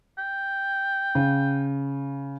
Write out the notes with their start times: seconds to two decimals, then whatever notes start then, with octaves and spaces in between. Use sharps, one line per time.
0.18 G5
1.15 C#3